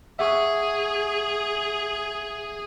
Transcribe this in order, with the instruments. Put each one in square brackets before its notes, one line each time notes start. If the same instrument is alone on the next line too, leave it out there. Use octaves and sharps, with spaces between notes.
[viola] G#4 [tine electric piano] E5 F#5 C#6